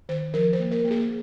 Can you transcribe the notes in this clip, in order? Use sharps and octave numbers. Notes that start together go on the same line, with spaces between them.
D#3 C5
F3 A#4
C5
A#3
A#4
A#3
G#4